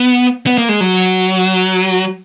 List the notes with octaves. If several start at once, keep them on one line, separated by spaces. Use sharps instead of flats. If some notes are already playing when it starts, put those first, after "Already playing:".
Already playing: B3
B3
A#3
G#3
F#3